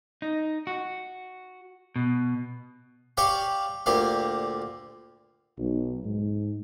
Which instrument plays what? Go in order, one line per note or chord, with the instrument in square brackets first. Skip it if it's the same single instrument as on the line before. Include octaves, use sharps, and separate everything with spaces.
[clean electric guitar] D#4
F#4
B2
[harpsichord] G4 C#5 D5 F5 G5
D2 A#2 G4 F5
[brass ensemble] B1
G#2